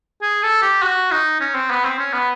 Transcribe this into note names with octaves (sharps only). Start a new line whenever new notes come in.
G#4
A4
G4
F#4
D#4
C#4
C4
B3
C4
C#4
B3